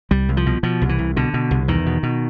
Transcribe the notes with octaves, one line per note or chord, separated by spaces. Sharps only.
C2 G3
C2
F3
B2
B2 F3
C2
E3
C2
B2 D3
B2
C2
E2 D#3
B2
B2